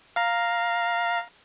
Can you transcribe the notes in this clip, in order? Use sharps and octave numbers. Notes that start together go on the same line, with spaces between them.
F5 A#5